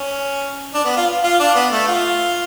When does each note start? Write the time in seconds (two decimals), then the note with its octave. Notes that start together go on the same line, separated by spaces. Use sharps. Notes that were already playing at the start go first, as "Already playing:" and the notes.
Already playing: C#4
0.75 D4
0.85 B3
0.96 F4
1.24 F4
1.40 D4
1.55 B3
1.72 A3
1.88 F4